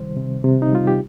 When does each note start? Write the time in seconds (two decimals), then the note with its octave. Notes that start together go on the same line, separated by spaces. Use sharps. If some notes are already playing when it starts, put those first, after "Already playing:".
Already playing: C3 D#3 G3 C5
0.16 C3
0.44 C3
0.62 D#4
0.72 G3 F4
0.87 G4